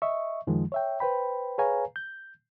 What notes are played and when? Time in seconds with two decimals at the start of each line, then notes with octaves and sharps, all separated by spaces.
0.02 D#5 E5 C#6
0.47 F#2 D#3 F3 G#3
0.72 C#5 E5 G5
1.00 B4 C5 G5 B5
1.58 G#4 B4 C#5 F5 G#5 A#5
1.96 G6